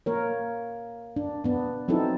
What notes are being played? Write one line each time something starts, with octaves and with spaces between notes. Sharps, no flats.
A#3 A#4 C#5
D4
B3 D4
F#3 C4 D#4 E4 A4